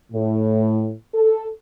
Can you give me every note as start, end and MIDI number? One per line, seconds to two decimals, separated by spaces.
0.13 0.92 45
1.13 1.47 69